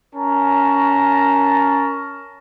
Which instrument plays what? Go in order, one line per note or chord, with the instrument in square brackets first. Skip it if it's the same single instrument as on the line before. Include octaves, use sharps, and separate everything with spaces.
[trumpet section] C#4 A#4 A5 A#5